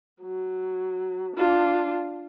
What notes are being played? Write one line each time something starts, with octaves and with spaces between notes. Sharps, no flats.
F#3
D4 F4